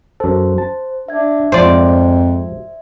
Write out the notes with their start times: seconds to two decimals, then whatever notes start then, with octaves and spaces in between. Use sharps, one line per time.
0.20 F#2 A4 C5
0.58 A5
1.08 D4 E5 G#6
1.52 F2 G#2 F3 C5 D5